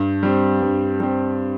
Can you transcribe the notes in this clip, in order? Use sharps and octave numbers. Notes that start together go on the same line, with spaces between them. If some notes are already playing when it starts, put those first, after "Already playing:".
Already playing: G2
G3 C4
G2
G3 C4